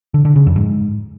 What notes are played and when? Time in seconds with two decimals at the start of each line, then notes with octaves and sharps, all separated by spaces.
0.14 D3
0.25 D3
0.36 C#3
0.47 F2
0.57 G#2